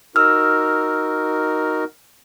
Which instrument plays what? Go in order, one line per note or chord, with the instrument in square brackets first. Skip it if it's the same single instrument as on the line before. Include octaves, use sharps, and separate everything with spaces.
[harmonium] D#4 F#4 A#4 [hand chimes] E6 F6